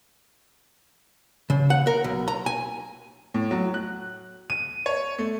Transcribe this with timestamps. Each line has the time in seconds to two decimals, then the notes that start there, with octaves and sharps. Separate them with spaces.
1.50 C#3
1.70 F#5
1.87 A#4
2.04 B1
2.28 A#5
2.46 G#5
3.34 A2
3.51 F#3
3.74 F#6
4.50 D#7
4.86 C#5
5.19 A3